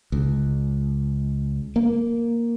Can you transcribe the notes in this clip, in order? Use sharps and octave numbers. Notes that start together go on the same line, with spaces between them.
C#2
A#3